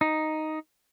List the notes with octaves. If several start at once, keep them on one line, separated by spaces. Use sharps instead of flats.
D#4